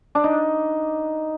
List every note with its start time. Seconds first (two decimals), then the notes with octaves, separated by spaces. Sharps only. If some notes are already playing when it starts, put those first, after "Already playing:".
0.15 D4
0.24 D#4